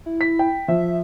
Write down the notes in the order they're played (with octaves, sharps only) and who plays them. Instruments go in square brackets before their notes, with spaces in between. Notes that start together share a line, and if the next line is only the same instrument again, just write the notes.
[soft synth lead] E4
[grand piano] B6
G5
[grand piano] F3 [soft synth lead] E5